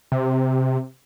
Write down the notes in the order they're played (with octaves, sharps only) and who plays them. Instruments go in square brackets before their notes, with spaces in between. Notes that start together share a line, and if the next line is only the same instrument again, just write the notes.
[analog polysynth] C3